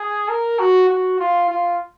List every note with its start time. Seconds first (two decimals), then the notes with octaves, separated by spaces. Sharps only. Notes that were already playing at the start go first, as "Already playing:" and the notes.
Already playing: G#4
0.28 A#4
0.59 F#4
0.89 F#4
1.19 F4
1.49 F4